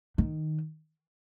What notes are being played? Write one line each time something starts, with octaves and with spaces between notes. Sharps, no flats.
D#3